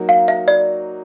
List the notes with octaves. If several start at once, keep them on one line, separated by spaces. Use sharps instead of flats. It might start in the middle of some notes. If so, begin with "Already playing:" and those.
Already playing: F#3 A#3 D#4 F#4
F5
E5
D5